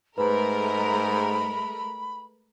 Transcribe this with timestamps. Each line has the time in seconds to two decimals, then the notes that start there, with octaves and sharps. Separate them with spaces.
0.18 G#2 G#3 A3 A#4 B4 B5